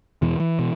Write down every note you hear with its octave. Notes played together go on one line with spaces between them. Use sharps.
E2 B2 E3
E3
B2